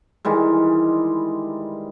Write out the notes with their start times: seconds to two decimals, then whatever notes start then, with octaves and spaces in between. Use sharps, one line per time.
0.25 D#3 E3 G3 G#3